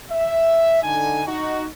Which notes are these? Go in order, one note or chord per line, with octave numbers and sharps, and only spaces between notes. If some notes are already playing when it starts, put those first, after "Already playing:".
E5
D3 D#4 G#5
D#4 F#4